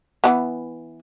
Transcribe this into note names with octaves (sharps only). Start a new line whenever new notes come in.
E3 G3 B3